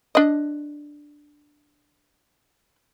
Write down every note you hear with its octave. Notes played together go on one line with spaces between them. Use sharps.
D4 D#5